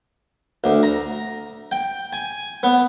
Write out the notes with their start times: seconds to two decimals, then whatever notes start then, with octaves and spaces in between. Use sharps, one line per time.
0.64 D2
0.83 A#5
1.72 G5
2.13 G#5
2.63 B3